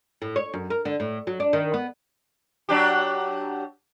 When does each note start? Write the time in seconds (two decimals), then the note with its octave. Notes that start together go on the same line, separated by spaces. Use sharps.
0.22 A2
0.36 C#5
0.54 F#2
0.70 A#4
0.85 D3
1.00 A2
1.27 F#3
1.40 D4
1.53 D#3
1.74 B3
2.69 F#3 D4 G4